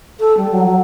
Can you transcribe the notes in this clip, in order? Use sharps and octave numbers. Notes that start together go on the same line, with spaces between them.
A4
G3
F#3
F#3